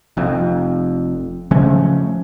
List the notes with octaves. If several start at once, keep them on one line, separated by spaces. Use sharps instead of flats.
F1 F2
C#3 F3 A3 C#4